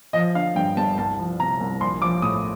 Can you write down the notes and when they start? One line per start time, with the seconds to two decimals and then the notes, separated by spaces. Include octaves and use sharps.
0.13 F3 D#5
0.35 D3 F5
0.55 G2 G5
0.77 G1 A5
0.98 C2 A5
1.19 F3
1.39 C3 A#5
1.61 C2
1.81 A#1 C6
2.02 F3 D6
2.22 A2 D#6